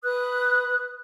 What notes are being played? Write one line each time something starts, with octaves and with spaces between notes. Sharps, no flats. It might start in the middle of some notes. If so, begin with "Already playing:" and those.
B4 D#6 F#6